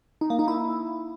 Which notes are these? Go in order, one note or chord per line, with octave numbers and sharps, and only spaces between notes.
D#4
A#3
D#4
E4